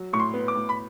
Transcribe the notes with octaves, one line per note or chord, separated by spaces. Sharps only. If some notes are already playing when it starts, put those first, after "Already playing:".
Already playing: F#3
A2 C#6
C6
B3
D6
A2
B5